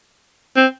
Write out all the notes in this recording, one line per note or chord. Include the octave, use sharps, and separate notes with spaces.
C4